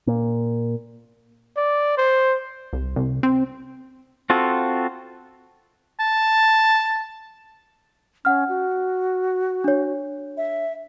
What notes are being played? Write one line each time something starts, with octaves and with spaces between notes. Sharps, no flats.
A#2
D5
C5
C2
C2
C4
C4 F4 F#4 A4
A5
C#4 F#5 F6
F#4
D4 C#5
E5